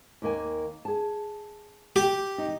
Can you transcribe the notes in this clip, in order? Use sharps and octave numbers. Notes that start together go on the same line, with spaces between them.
D#2 A#3 G#5
G#4 A5
G4
D#4